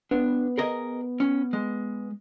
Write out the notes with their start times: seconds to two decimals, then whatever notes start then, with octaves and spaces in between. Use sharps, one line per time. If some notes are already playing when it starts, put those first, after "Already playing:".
0.11 B3 D4
0.58 G#4 A#4 D#5
1.20 C#4
1.53 G#3